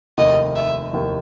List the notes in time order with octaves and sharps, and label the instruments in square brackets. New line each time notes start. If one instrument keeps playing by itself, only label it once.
[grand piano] F1 D#2 D#3 [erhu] D#5
[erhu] E5
[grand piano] F1 D#2 D#3